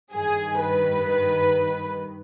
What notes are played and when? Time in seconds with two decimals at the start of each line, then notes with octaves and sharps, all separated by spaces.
0.13 G2 D#3 G#4
0.60 B4